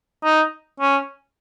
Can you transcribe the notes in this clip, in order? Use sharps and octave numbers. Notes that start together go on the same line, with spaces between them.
D#4
C#4